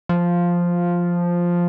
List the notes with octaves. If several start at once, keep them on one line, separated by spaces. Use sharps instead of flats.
F3